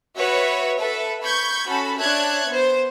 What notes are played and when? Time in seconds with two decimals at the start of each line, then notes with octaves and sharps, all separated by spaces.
0.16 F#4 B4 C#5 E5
0.80 A4 B4 E5
1.23 B5 C#6 G6 G#6
1.68 C#4 F#4 A4 B5
1.98 D4 C#5 E5 A5 F#6 G#6
2.48 B3 C5